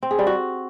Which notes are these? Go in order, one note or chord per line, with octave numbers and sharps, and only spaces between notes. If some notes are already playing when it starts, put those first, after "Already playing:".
C4
G#4
G3
F#4